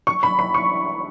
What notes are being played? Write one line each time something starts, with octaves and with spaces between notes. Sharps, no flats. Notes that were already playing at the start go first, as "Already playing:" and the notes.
C#6
B5
B5
C#6